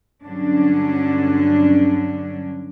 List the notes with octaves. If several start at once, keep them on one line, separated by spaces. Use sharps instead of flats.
G2 D3 F#3 C#4 D4